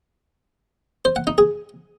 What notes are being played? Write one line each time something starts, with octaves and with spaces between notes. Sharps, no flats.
C5
F#5
D#4
G#4